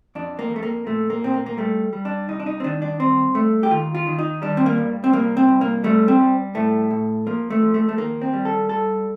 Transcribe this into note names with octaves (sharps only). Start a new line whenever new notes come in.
F2 D4
A#3
F2
A3
A#3
A#2 A3
A#3
A#2 C4
A#3
A#3
G3 A3
G3
D4
C2 D#4
D4
D#4
C4
D#3 D4
D4
G2 C4
G2 A3
G4
D#2 F4
F4
D#3
D#4
G3 D4
C4
A#3
G2
C4
C2 A#3
C4
C2
A#3
G3 A3
C4
G3
A2 A3
A2
F3 A#3
A3
F3
A3
A3
D#3 A#3
C4
G3
A4
G2 A4